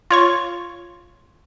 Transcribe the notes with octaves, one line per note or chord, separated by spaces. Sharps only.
F4 C#5 C#6